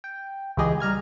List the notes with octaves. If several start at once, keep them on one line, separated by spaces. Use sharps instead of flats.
G5
C#2 E3 G4 G#4 D#5
G3 A#5 F6 G#6